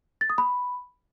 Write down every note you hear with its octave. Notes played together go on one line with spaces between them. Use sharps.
A6
D#6
B5